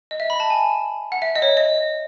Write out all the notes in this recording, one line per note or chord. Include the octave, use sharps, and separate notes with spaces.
D#5
E5
B5
A5
G#5
F#5
E5
D#5
C#5
D#5